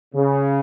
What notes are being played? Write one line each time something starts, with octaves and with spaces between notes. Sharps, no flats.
C#3